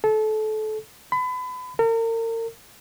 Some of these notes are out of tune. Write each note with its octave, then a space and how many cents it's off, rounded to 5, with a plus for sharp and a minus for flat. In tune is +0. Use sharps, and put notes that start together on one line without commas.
A4 -25
B5 +30
A#4 -40